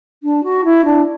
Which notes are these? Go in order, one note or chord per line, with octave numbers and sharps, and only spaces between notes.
D4
F#4
E4
D4